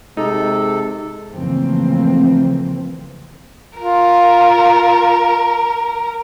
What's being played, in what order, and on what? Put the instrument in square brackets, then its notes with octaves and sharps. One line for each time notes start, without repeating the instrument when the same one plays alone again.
[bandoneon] C3 A4 [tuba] G#3 [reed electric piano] D#4
[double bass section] C#3 E3 F3 A3 A#3 C4
[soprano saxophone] F4 [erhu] A#4